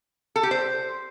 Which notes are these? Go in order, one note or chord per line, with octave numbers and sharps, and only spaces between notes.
A4
G4
C5